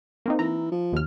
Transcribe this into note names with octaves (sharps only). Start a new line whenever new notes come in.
A#3 C4 D#4
E3 A#5
F3
D#2 F6